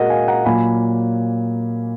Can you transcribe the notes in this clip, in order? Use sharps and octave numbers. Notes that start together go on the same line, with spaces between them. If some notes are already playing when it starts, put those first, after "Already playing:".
Already playing: A#2 G#3 F#4 A#4 D#5 F#5
F5 G#5
F#5 A#5
A#2 F#3 A#3 G#5 B5